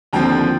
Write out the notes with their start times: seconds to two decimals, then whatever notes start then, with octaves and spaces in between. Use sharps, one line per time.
0.13 D#2 D3 F3 C4 G5 A#5